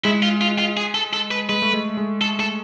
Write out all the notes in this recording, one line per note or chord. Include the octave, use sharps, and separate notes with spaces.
G#3 E4
F4
F4
F4
G#4
A4
A4
B4
G#3 B4
A3
G#3
G#3
A4
A4